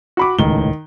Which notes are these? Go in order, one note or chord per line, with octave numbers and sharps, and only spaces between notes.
F#4 B5 D6
D#1 C#2 A2 D#3 G7